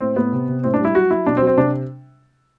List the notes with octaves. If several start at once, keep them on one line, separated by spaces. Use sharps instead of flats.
A2 C4
A2 B3
C3
C3
A2 C4
D4
G3 E4
F#3 F#4
F#3 E4
B2 D4
C4
F#3
C4
C3 D4